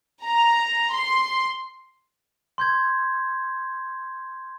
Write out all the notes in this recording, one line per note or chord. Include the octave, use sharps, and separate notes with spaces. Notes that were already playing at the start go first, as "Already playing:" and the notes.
A#5
C6
C6 G6 G#6